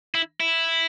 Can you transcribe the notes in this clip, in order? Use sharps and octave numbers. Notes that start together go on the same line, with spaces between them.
E4
E4